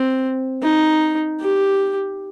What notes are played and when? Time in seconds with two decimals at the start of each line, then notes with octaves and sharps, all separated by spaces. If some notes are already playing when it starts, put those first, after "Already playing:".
Already playing: C4
0.62 D#4
1.41 G4